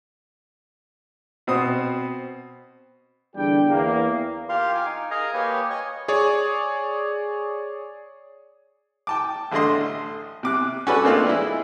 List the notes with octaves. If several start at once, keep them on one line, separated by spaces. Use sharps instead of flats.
B2 C4 D#6
E2 D3 G3 D4 G4 G5
E2 A#3
F4 G4 A#4 F5 C6
G#5 D6
D#4
G#4 A#4 D#5 F5 G#5 A#5
A#3 G4 B4 C#5 G#5
C#5 D#5 G#5 C#6
G#4 C#5 D5
G5 A5 D6
A1 D3 A3 D#5 C6
C3 D6 F#6
C#4 F#4 A4 B4 D5
A3 A#3 C4 D4 D#4 F4
E3 G#3 E4